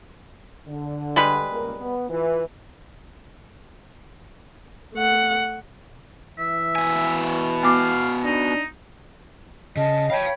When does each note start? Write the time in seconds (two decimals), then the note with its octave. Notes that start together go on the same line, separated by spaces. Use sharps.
0.68 D3
1.16 G3 G#3 B4
1.51 C#2 A#3 A#4
1.80 B3
2.10 E3 F4 B4
4.94 A3 F#5
6.38 E3 E5
6.75 B2 G#5
7.63 B3 F#4 F5 D6
8.25 D4 D#4
9.77 C#3 D#5 A5
10.10 C#5 F5 G5 A5 B5